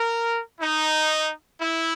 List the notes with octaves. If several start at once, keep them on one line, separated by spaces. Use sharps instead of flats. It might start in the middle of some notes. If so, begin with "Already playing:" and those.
Already playing: A#4
D#4
E4